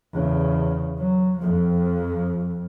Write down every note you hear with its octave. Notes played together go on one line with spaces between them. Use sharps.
E2 C#3
F#3
F2 F3